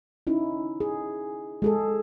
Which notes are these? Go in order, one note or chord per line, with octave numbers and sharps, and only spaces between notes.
C#4 D#4 E4
G#4
G#3 G#4 A4